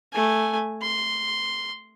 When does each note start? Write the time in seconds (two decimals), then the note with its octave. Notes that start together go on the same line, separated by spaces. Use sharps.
0.13 A3 G#5
0.82 C6